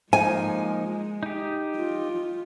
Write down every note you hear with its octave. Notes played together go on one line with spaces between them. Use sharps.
F3 G#3 A#3 D#4 G#5
D#4 G4
F4